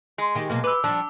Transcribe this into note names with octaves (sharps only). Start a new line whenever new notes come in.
G#3
D#3 G4
B2 F#3 A#3
B4 D6 E6
F3 G3 D4